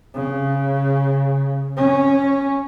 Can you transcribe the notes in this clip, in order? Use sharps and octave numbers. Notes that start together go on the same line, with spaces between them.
C#3
C#4